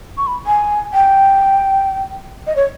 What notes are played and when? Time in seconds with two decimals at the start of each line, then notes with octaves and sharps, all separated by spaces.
0.17 C#6
0.27 B5
0.47 G#5
0.94 G5
2.47 D#5
2.56 C#5